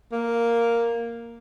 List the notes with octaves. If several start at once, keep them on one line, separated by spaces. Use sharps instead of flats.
A#3